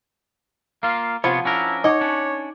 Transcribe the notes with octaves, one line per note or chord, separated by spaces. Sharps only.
A#3 F4 F5
C3 F3 B3 F4 C#5 F#5 B5
C#4 D4 E4 A#4
D#4 C#5 D#5 F#5 D6
C#4 D4